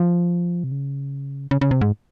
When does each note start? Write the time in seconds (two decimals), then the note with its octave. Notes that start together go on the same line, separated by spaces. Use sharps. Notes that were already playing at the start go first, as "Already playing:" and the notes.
Already playing: F3
0.64 C3
0.72 C#3
1.51 C#3
1.61 C#3
1.71 C3
1.81 G#2